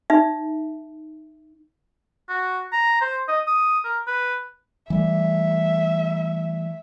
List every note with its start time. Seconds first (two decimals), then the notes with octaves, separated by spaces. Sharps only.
0.10 D#4 E5
2.29 F#4
2.73 A#5
3.01 C5
3.28 D#5
3.47 D#6
3.85 A#4
4.07 B4
4.90 E3 G3 A3 E5